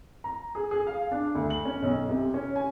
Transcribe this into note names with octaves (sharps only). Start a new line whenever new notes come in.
A#5
G#4
G#4
F5
D4
D2
F#7
C#4
B1
C3
C#4
G#5